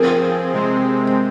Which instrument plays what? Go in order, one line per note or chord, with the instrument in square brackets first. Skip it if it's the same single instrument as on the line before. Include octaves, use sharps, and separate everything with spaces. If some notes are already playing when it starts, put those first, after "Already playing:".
Already playing: [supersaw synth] F3 C4 G#4 [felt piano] A#4
[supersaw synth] C3 G#3 C4